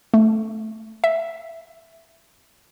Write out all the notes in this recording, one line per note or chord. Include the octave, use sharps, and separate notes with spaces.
A3
E5